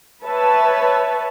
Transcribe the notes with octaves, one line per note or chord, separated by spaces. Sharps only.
B4 C#5 E5 A5